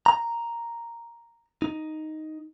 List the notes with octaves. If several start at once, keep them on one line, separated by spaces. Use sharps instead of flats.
A#5
D#4